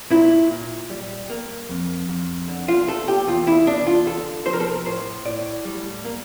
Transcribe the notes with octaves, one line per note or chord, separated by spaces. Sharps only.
A#2 E4
A#2
G3
A#3
F2
F2
D3
F4
A3 A4
G4
E2 F4
E4
E2 D4
F4
D3 A4
F3 C5
A#4
A4
A#4
A2 C5
A2 D5
G3
A#3